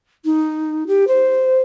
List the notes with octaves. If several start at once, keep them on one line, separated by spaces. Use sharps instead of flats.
D#4
G4
C5